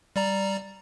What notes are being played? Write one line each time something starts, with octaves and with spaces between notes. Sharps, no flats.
G3 D5 A#5